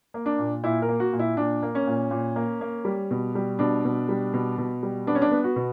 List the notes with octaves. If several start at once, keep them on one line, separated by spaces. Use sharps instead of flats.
A#3
D4
A#2
A#2 E4
A#4
A#3
F#4
A#2
E4
A#2 D4
A#3
C#4
A#2
A#2
A#3
A#3
G3
B2
G3
B2 D4
B2
G3
B2
B2
G3
B3 D4
C#4
D4
B3
F#4
B2